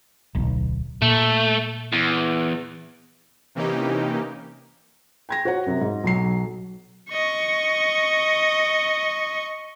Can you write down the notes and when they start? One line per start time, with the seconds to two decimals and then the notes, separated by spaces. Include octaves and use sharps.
0.35 D1 B1
1.02 A#2 A3
1.93 E2
3.55 C3 E3 A#3 C#4 D#4 G4
5.29 G5 G#6 A#6
5.45 F#4 C5 C#5 F#5
5.67 F#2 C3
5.81 G#2
6.04 B1 F#3 C7
7.10 D#5 C#6